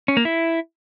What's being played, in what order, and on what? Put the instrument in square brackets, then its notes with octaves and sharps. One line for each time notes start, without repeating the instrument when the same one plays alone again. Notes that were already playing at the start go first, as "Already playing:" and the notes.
[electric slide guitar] C#4
A#3
E4